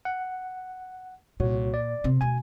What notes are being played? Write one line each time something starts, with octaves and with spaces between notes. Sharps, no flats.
F#5
C2 A#2 F#4 C#5
D5
C3 C4
D2 B2 G#5